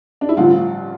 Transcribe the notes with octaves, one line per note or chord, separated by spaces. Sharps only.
D4
E4
A1 G2 D3 F3 F4